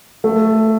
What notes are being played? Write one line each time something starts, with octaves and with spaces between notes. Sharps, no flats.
A3